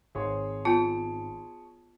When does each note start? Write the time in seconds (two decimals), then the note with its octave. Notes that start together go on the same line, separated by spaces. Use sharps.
0.15 G#1 G#4 C#5 C6
0.65 B3 F4 A5